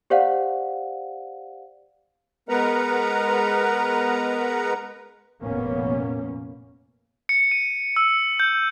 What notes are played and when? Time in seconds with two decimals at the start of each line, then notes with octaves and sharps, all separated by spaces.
0.10 G4 C5 D5 F5 F#5
2.49 G#3 B3 A#4 B4 F#5 A#5
5.42 F1 A#2 A#3 B3 C#4
7.29 C#7
7.52 D#7
7.96 E6
8.40 G6